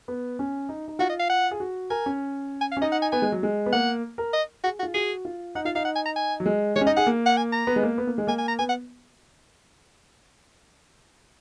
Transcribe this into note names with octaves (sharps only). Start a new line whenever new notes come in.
B3
C#4
D#4
D#4
F4 F#4
D#5
F5
F#5
G#4
F#4
A#4 G#5
C#4
G#5
F5
C#4
D#4 D#5
F#5
G#5
B3 G#5
G#3
F#3
G#3
B3
A#3 F#5
A#4
D#5
F#4 G#4
F#4
F4
F#4 G#4
F4
D#4 F#5
F4 F5
D#4 F5
F#5
G#5
A#5
G#5
F#3
G#3
G#3 C#5
C#4
D#4 D#5
G#4 F#5
A#3
F#5
G#5
A#5
B3
G#3
A#3
B3
A#3
G#3
A#3 G#5
G#5
A#5
B3 G#5
F#5